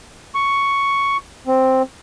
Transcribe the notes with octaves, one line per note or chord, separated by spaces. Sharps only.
C#6
C4